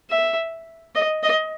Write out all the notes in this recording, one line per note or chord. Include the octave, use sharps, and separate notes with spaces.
E5
D#5
D#5